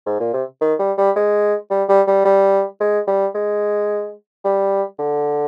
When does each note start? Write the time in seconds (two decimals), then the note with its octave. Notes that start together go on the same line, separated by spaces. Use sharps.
0.07 G#2
0.20 A#2
0.34 C3
0.62 D#3
0.79 G3
0.98 G3
1.16 G#3
1.71 G3
1.89 G3
2.08 G3
2.25 G3
2.81 G#3
3.08 G3
3.35 G#3
4.45 G3
4.99 D3